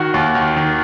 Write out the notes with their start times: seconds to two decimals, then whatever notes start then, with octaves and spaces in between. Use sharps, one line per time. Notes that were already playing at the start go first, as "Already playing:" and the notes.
Already playing: D#3 F#4 F#5
0.14 D#2
0.35 D#3
0.57 D#3